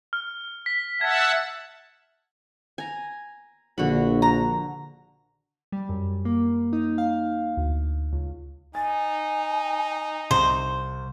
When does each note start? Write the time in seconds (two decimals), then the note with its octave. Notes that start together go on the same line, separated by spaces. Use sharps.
0.13 F6
0.66 B6
1.01 E5 F#5 A5 G#6 B6
2.78 G#5 A#5
3.78 A#1 D3 F#4 B5
4.22 A#5
5.72 G3
5.89 F#2
6.25 A#3
6.73 D#4
6.98 F5
7.57 D2
8.13 C#2
8.75 D#4 G#5 A6
10.31 C2 C5